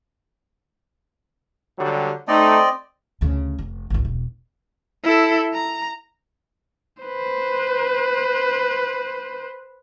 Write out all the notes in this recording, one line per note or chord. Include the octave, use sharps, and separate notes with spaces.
D3 F#3 G3
A3 C4 D#4 D5 D#5
D2 C#3
F1
G#1 C#2
E1
E4 A4
A#5
B4 C5